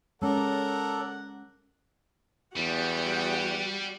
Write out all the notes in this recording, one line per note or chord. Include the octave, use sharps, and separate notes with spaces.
G#3 C#4 A4 A#4 C#5 D5 F#5
E2 G3 F#4 G4 F#5